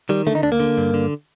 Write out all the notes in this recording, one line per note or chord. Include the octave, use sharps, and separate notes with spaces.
D#3 G3
D3 A3
D#4
D2 D4
A#3
D3
G2
D3